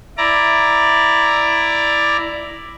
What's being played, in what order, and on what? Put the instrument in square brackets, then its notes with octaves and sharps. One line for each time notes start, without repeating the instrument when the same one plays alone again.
[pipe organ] E4 D5 A#5